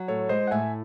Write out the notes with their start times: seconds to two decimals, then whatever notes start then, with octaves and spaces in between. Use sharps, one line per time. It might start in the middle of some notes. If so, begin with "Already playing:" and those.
Already playing: F#3
0.08 A2 A4 C#5
0.29 G#3 C5 D#5
0.47 F#5
0.51 A2 E5 G#5